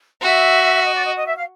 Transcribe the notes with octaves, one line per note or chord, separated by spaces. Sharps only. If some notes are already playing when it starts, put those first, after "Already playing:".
F#4 E5
D#5
D5
D#5
D#5
E5
F5